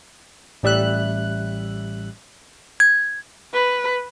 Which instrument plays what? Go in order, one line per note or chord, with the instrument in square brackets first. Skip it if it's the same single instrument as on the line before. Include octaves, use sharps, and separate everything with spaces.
[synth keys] A1 G3 E5 F#6
[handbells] G#6
[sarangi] B4